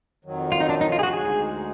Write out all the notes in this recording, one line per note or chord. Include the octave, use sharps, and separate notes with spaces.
F2 D#3 F#3
F4
D#4
D4
D#4
F4
G#4
F#4
D2 D3 G#3 D#4 G#4